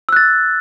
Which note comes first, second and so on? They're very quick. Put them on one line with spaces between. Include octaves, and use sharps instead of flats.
E6 F#6 A6